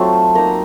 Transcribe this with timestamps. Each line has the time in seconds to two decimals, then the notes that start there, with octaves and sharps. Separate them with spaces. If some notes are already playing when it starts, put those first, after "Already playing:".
Already playing: F#3 A3 C4 D#4 F4 A5
0.35 A#3 D#4 A#5